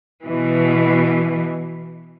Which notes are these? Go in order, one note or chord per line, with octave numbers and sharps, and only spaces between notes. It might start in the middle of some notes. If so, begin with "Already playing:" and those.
B2 E3